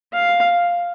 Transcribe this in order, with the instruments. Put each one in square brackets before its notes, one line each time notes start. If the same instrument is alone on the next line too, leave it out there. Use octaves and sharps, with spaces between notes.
[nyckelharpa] F5